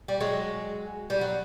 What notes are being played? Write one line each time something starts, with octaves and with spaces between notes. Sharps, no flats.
G3
F#3 G#3
G3
F#3